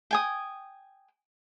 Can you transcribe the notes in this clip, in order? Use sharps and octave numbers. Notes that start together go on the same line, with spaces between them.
G5 G#5 D#6